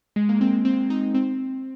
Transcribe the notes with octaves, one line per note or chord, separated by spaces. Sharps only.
G#3
A#3
C4
C4
C4
D#4
C4